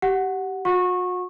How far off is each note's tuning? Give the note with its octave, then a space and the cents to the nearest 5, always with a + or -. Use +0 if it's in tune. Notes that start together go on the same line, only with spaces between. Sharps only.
G4 -20 F#5 +0
F#4 -45 F#5 -30 C#6 -20